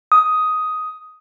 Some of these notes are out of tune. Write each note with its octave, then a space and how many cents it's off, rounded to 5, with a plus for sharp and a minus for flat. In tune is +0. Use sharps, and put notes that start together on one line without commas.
D#6 +10